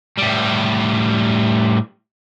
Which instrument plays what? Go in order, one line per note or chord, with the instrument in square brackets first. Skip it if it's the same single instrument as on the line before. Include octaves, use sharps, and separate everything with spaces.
[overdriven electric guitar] A2 G3